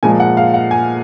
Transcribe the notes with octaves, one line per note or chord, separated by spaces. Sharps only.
A#2 F3 G#3 G#5
F#5
F5
F#5
G#5